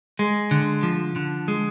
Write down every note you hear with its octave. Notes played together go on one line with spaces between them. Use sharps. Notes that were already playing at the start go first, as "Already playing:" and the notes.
G#3
D3
F3
D3
G#3